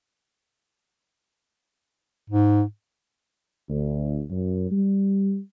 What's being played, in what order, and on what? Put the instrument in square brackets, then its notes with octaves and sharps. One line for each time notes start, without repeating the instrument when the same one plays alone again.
[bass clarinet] G#2
[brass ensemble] D2
F#2
G3